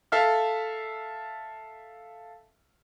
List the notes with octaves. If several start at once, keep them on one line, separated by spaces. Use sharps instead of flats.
A4 E5 F5 F6